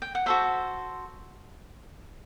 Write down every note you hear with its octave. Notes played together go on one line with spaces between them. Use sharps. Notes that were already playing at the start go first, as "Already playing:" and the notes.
G5
F#5
F#4 A4 C5 E5